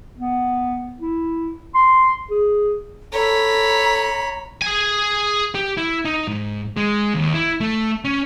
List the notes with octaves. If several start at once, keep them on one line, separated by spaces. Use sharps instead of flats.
B3
E4
C6
G#4
A4 C#5 A#5 B5
G#4 G#5
G4
E4
D#4
G#2
G#3
D#2
E4
A3
C#4